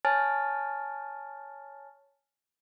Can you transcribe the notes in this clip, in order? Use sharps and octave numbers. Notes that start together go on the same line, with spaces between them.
C#5 G#5 A5 F6 A6